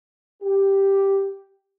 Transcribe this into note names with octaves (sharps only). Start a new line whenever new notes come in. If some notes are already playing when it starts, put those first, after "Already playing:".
G4